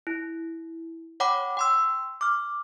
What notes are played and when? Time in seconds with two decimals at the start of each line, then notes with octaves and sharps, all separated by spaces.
0.07 E4
1.20 C#5 F#5 G5 B5 D6
1.57 G5 C6 E6
2.21 D6 F6